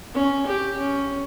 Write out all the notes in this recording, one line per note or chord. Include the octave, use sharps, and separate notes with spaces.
C#4
G4
C#4